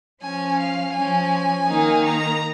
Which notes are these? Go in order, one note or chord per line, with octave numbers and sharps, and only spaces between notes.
F3 C#4 G#5
F5
F3 C#4 G#5
D#3 A#3 D#4
A#5